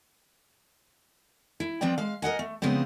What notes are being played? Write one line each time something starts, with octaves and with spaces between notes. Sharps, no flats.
E4
F3 C4 B4 D5 G5
G#3 F5
A#4 D#5 F#5 G#5
A3
C#3 F3 G#3 B3 C4